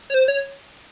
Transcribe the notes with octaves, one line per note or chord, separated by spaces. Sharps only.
C#5
C5
C#5